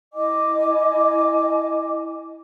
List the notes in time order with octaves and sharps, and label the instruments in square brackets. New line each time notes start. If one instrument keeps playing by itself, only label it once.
[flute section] E4 D#5 G#5 D6